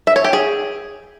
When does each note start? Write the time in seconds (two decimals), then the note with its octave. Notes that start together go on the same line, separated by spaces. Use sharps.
0.07 E5
0.16 C#5
0.24 G4
0.33 G#4